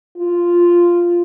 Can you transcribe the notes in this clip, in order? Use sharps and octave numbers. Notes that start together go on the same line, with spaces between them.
F4